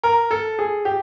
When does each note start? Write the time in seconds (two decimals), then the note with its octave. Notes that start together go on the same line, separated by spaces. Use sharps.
0.04 A#4
0.31 A4
0.59 G#4
0.85 G4